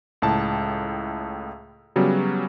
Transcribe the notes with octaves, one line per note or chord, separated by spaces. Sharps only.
C#2 A2 A5
C#3 F#3 G3 B3